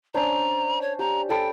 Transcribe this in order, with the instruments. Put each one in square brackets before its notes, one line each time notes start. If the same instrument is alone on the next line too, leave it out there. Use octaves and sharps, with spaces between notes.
[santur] C#4 D4 C5 [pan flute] A#5
[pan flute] C#5
[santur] G4 [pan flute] A#5
[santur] G4 A4 B5 [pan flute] G5